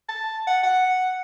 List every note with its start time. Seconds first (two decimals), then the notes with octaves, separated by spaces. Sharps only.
0.09 A5
0.47 F#5
0.63 F#5